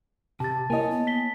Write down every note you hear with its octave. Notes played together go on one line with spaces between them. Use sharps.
C3 G4 A5 A6
A#3 E4 C#5 D#5 G#5
B3
B6 G7